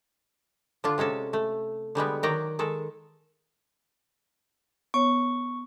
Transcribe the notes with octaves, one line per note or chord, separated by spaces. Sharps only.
D3 D4 F4
C3 G#3 C#4 A4
A3
D3 G3 G#3 B3
D#3 F#3 D5 G5 A#5
D#3 G#3 A4
B3 C#5 C#6